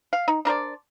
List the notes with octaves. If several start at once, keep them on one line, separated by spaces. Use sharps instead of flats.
F5
D#4
D4 A#4 C5 D5